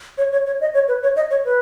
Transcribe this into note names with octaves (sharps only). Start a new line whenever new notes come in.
C#5
C#5
C#5
D#5
C#5
B4
C#5
D#5
C#5
B4